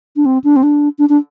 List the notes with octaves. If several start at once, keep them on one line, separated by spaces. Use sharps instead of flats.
D4
C4
D4
C4
D4
D4
D4